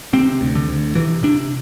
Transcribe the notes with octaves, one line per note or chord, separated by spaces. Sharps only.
C3 C4
D2
D3
D2
C3 E3
C3 D4